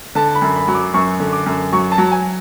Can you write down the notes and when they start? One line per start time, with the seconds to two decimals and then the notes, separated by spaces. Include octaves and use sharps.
0.15 D3 A5
0.35 B5
0.42 F#2
0.55 B5
0.68 F#3
0.75 D6
0.94 F#2 C#6
1.20 D3
1.33 D6
1.46 F#2
1.72 F#3 C#6
1.92 A5
1.98 F#3
2.12 G#5